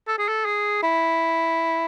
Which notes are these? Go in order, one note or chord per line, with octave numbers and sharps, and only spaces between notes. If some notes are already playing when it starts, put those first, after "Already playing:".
A4
G#4
A4
G#4
E4